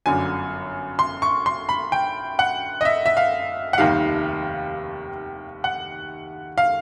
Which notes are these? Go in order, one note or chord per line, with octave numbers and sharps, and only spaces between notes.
G1 F#2 D3 F#3 G#5
C6
C#6
C6
B5
G5
F#5
D#5
E5
E5
F5
F#5
F1 D#2 D#3 G3 F5
F#5
F5